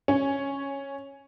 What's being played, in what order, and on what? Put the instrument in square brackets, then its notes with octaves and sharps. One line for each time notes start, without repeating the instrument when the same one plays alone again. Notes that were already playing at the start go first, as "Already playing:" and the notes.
[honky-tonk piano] C#4